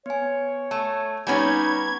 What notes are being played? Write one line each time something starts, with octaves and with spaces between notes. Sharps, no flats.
B3 C#5 G#5
A3 A5
G3 B3 C#4 D#4 G#5 B5 C#6 G#6